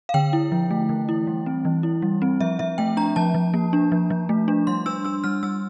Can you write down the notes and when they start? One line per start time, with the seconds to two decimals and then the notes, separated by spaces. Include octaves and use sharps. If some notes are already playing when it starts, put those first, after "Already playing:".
0.09 F5
0.14 D3 G5
0.33 E4
0.52 F3
0.71 A3
0.89 E3
1.09 E4
1.27 G3
1.46 C4
1.65 E3
1.83 E4
2.02 G3
2.22 C4
2.40 F3 E5
2.59 F3 E5
2.78 A3 G5
2.97 D4 A#5
3.16 F3 A5
3.34 F3
3.54 A#3
3.73 D4
3.92 F3
4.10 F3
4.29 A3
4.48 D4
4.67 G3 C6
4.86 D4 E6
5.05 D4 E6
5.24 G3 F6
5.43 G3 E6